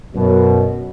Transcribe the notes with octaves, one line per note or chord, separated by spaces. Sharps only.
F#2 B2